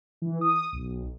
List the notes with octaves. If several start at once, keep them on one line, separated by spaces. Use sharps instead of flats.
E3
D#6
B1